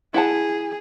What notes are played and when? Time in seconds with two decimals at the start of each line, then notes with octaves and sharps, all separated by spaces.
0.14 E4 G#4 F#5 A5